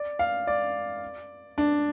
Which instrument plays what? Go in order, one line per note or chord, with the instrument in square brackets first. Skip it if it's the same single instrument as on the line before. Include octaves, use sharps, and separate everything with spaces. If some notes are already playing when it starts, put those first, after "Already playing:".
Already playing: [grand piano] D5
F5
D5
D4